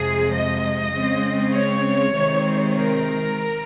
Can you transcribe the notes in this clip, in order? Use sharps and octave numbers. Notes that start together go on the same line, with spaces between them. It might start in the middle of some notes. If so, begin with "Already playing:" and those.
Already playing: F2 C3 F3 G#3 G#4
D#5
C#3 G#3 C4
C#5
C3 D#3 G#3 C4
A#4